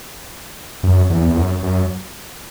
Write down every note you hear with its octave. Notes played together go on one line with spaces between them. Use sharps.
F#2
E2
E2
F#2
F#2